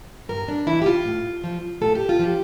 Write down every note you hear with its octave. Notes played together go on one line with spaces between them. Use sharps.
G2 A#4
D4
E3 E4
G4
F4
A2
F3
A2 A4
G4
F4
F3 G4